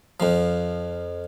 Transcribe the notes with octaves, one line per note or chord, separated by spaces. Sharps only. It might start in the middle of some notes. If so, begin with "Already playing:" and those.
F2 F3